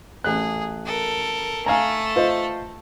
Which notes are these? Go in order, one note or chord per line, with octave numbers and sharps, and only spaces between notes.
A1 G#4 F#6
A4 A#4
A3 A4 F5 G#5 A#5
F4 C5 D#5